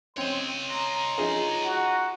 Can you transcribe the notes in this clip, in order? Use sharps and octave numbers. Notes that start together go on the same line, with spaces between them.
C4 C#4 C#5 D#5 C6
A#5
D#4 F4 G#4
F#4